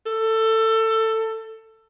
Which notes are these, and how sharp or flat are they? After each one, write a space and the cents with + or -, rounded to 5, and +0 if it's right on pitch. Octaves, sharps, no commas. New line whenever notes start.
A4 +20